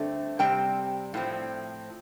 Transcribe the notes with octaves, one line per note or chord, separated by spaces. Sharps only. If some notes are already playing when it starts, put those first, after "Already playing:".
Already playing: G2 D3 A3 C4
C3 G3 C4 G5
A2 F3 C4